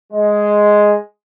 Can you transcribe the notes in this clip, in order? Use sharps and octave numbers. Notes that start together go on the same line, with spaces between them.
G#3